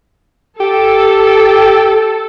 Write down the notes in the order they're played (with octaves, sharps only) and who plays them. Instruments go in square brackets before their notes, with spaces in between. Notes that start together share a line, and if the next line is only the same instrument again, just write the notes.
[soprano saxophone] G4 [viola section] A4